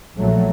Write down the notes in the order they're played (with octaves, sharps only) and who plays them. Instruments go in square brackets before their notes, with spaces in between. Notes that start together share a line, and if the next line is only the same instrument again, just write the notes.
[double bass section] A#1 A#2 F#3 A3